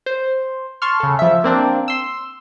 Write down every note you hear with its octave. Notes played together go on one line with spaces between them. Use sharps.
C5
A5 C6 C#6 F6
C#3 A4
F3 E5
A#3 C4 D4
C6 E6